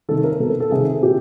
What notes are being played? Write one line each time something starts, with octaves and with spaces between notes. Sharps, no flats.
C3 D#3 A4
A#4
B2 A4
A4
C3 D#3 G#4
A#2 G4